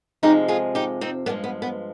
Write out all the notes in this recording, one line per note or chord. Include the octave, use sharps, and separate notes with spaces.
F2 C3 F3 G#3 D#4 G4
F4 G#4
D#4 G4
C4 D#4
G2 F3 G#3 B3 D4
B3
B3